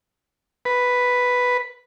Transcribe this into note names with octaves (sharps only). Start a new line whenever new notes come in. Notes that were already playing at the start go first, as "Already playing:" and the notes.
B4